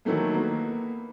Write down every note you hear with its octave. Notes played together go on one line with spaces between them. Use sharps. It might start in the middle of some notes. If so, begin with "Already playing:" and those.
D#3 E3 F#3 A3 A#3
A#3 B3